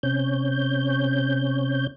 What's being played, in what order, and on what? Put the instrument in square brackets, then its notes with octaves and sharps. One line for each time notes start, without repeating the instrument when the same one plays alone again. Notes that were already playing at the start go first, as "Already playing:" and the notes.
[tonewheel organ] C3 C#4 G6